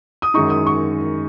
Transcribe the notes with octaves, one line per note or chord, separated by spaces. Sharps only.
D#6
F#2 D#3 G#3 D#4 C#6
D#6
C#6